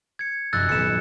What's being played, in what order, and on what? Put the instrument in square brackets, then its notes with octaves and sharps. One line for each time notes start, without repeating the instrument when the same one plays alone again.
[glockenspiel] G#6 C#7
[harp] F1 F#2 A#6 [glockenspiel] E6 F#6 A6
[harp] D#1 B3 B4 [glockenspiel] C#7 E7